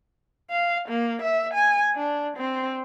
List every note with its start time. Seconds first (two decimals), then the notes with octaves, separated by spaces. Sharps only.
0.51 F5
0.89 A#3
1.22 E5
1.54 G#5
1.96 D4
2.37 C4